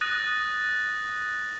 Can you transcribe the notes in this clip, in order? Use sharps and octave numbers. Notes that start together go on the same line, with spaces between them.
D#6 F#6 A6 A#6 D#7